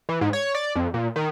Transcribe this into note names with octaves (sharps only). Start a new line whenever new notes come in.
E3
G#2
C#5
D5
F2
A#2
D#3